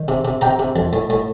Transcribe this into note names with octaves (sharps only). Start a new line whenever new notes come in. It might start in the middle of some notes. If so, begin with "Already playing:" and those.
Already playing: D#3
C3
C3
C3 G5 A#5
C3
F2
A2
A2